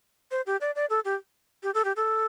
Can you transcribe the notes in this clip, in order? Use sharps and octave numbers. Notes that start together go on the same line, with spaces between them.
C5
G4
D5
D5
A4
G4
G4
A4
G4
A4